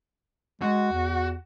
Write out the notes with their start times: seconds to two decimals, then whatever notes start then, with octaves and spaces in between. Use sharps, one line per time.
0.62 G#3 F#4
0.93 E2